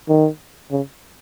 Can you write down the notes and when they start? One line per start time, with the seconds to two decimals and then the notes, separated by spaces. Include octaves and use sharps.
0.09 D#3
0.71 C#3